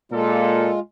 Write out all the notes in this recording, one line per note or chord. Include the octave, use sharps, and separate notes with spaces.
A#2 G#3 F4 A4